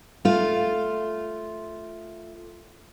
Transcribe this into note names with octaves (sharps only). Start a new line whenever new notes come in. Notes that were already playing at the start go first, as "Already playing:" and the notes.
A3 F4